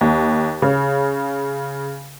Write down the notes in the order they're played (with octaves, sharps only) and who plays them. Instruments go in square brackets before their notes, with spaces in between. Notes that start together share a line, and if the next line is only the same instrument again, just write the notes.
[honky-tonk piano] D#2
C#3